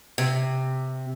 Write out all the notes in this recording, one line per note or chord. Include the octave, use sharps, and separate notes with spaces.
C3